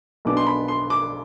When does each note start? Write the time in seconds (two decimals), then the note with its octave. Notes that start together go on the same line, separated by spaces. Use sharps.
0.25 B1 B2 B3 D4 D6
0.37 C6
0.47 B5
0.68 C6
0.90 D6